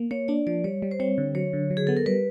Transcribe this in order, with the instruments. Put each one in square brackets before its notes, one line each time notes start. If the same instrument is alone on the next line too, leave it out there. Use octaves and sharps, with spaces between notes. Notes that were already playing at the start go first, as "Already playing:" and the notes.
Already playing: [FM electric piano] A#3
[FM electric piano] A#3 [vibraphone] C#5
[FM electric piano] D4 [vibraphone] D5
[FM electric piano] F3 [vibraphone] D5
[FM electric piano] G3 [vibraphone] C#5
[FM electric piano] G3
[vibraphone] C5
[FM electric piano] C4 [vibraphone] C#5
[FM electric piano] D3
[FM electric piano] F#3 [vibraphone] C#5
[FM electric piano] D3
F#3
[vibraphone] G#4
[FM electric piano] B3 [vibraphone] A4
[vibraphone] A#4
[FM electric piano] G3 [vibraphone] B4